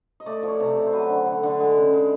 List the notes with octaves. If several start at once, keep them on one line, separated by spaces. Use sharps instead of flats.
D#5
A3 D5
F3
C#5
C3
C3
C5
F#3 B4
D3
D3
D3
G#3
C#3
G#3